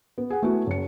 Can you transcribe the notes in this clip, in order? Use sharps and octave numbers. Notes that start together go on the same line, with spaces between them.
B3
G#4 F#5
A3 B3 E4 F#4
F#1 C#7